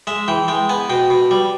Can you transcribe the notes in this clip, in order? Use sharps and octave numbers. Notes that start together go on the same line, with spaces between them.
G#3 E5
E3 G5
G#3 G5
B3 G#5
B2 G5
B2
G3